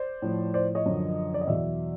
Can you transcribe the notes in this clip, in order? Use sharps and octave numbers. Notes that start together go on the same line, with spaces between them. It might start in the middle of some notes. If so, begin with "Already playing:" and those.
Already playing: C5 D5
A2 F3
C5 D5
C#5 D#5
F#2 D3 F3
D5
D#5
E2 B2 F#3 D5 E5